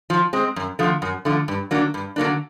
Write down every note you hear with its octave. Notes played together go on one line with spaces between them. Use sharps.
F3
G#3 C4
F#2
D3 F3 A3
F#2
D3 F3 A3
G2
D3 F#3 A#3 D4
G2
D3 F#3 A#3 D4